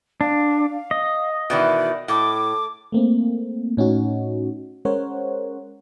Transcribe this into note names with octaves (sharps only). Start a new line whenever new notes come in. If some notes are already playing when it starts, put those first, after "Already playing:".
D4 F5
D#5
B2 D#3 E3 D5
A2 D6
A3 A#3 C4
A2 C#4 D#4 F#4
G#3 C#4 A#4 C5 C#5 F#5